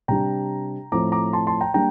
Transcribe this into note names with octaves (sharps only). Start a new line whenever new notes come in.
C3 G3 D4 G5 A#5
A2 F3 A3 C4 A#5 D6
A#5 D6
A5 C6
A5 C6
G5 A#5
G3 A#3 D4 G5 A#5